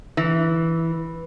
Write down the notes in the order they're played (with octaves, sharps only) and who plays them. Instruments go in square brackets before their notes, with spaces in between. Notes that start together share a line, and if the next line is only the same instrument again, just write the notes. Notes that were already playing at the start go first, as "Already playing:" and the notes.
[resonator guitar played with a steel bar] E3